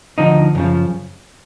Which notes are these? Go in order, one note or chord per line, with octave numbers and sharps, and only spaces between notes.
D2 D3 F3 D#4
F#2 C#3 F3